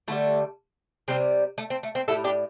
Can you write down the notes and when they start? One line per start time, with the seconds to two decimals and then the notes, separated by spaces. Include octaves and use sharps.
0.08 D3 G3 A3
1.08 C3 G3 C4
1.58 A3
1.70 C4
1.83 A3
1.95 C4
2.08 A2 G3 E4 A4
2.24 D4 G4